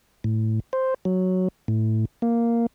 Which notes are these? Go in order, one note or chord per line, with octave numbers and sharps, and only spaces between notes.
A2
C5
F#3
A2
A#3